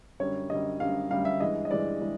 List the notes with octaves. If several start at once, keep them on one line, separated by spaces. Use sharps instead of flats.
F#2 D3 G3 C#5
F#2 D3 G3 D#5
F#2 D3 G3 F5
F#2 D3 G3 F5
E5
G2 E3 G#3 D#5
D#5
G2 E3 G#3 D5
E3 G#3